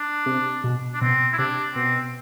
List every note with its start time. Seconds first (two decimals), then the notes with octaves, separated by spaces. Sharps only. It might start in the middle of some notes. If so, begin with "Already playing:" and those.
Already playing: D4
0.26 C3
0.64 B2
0.94 D4
1.01 B2 C4
1.33 E4
1.38 C3 D4
1.75 B2 C4